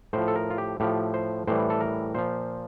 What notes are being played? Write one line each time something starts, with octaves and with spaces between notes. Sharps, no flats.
A2 F3 C5
A4
A#4
F4
G4
A2 F3 G4
C5
A2 E3 G3 C5
A4
A#4
A#2 F3 C5